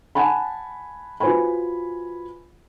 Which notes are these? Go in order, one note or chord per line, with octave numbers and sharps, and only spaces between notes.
F#5 G#5 A5 B5
F4 F#4 B4 C5 G#5 B5